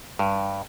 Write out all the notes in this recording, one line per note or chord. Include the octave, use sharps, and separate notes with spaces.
G2